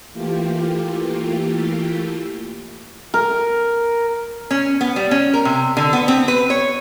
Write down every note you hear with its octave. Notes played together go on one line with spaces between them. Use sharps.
E3 A3 A#3 F4 G4
A#4
C#4
B3
G3
C#4
A#4
C3
D3
B3
C4
B4
C#5